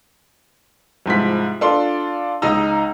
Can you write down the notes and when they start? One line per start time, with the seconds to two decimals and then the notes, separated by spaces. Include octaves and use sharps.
1.06 C2 G#2 F3 B6
1.61 D4 F4 A4 C6
2.42 C#2 D#4 D#5 A#5 E6